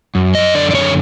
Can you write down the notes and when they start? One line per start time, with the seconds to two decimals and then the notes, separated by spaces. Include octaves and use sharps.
0.15 F#2
0.35 D#5
0.55 D3 D5
0.71 D5
0.75 C#5